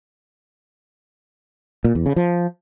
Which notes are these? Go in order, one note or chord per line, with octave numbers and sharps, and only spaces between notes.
A#2
E2
C#3
F3